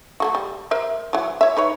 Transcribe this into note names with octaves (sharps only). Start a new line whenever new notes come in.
A3 A#3 F#4
G3
A#4 C5 E5
E3 F#3
C#5 E5
D#4 B4 C#5